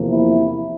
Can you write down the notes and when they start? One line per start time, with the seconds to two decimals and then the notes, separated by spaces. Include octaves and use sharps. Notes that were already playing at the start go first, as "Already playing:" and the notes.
Already playing: E2 C3 F3 A#3
0.10 E4